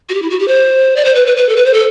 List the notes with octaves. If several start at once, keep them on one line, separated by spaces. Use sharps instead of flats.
F#4
G4
E4
F#4
G4
C5
D5
C5
B4
B4
B4
A4
B4
C5
A4